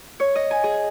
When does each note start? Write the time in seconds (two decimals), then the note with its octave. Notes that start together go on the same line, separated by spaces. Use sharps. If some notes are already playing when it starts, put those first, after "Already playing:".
0.20 C#5
0.35 D#5
0.51 G#5
0.64 G#4